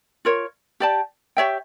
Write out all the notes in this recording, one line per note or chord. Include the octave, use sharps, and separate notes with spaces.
F4 A#4 C#5
G4 D5 A5
G4 C#5 E5 G5